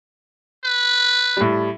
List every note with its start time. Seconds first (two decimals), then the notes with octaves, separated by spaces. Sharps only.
0.65 B4
1.37 A2 G3